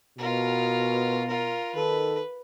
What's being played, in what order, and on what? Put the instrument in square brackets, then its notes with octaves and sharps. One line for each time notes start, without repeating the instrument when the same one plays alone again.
[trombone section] B2 [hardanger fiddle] F4 A#4
[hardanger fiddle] F4 A#4
[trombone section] D#3 A4 [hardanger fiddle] B4